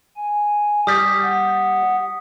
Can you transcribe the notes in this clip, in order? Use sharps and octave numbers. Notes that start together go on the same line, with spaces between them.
G#5
G3 D#6 B6
F#5